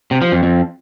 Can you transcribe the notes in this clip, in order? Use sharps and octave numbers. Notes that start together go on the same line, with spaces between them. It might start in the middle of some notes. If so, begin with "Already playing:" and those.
C3
F3
F2
F2